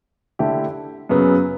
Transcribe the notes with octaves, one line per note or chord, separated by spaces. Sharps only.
D3 A3 E4 G4
F#2 C#3 F#3 B3